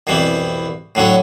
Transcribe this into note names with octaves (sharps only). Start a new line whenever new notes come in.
C2 F2 B2 E3 G3
A2 D3 F#3 C#4